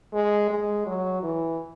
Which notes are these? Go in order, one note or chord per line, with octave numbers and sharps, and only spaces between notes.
G#3
G#3
F#3
E3